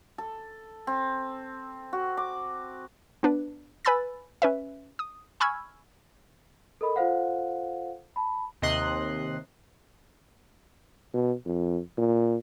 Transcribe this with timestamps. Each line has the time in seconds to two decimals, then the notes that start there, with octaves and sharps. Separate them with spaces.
0.18 A4
0.87 C4
1.93 F#4
2.17 D6
3.23 B3 D4 B4
3.85 B4 G#5 B5 E6 A6
4.42 C#4 B4 E5
4.99 D#6
5.40 G#5 B5 C#6 E6 F6 G#6
6.81 A4 A#4 D#5 B5
6.96 F4 A4 C5 F5 F#5
8.16 A5 B5
8.62 D#2 C3 D#5 C6 F#6
11.14 B2
11.45 F2
11.97 A#2